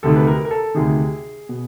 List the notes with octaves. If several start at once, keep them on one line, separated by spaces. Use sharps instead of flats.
D2 C3 D#3 A4
B4
A#4
A#4
A4
D2 C3 D#3 G#4
B2